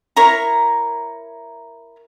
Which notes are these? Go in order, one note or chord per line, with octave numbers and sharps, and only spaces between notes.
E4 A#4 C#5 A#5